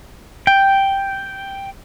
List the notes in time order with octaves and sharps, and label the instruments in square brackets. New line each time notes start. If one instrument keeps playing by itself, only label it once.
[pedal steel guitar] G5